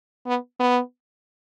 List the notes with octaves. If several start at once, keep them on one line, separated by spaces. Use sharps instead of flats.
B3
B3